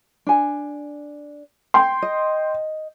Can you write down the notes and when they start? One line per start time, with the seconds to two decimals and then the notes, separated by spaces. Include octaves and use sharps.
0.27 D4 G#5
1.74 G5 C6
2.02 D#5